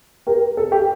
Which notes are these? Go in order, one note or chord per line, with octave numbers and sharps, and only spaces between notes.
G4 A#4
A4
G4